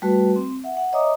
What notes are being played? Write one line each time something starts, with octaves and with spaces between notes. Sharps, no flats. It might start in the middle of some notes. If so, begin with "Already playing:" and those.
G3 A3 F#4 B4
C4
E5 F#5
F#5
C#5 D#5 E5 A#5 D6 D#6